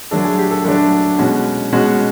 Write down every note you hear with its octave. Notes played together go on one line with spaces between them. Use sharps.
D3 F#3 A3 D4 A4
G#4
G4
A4
D3 F#3 A3 D4 A4
B2 G#3 C#4 F#4
B2 G#3 C#4 F#4